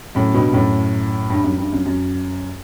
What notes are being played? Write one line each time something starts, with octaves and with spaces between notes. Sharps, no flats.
F#2 A2
G2 B2
F#2 A2
G2
F#2
G2
F#2
F#2